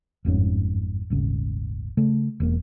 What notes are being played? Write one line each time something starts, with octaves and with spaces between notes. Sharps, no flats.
G1 F2 G#2 C#4
D#1 G#1 C#3
C#3 A3
E1 A#3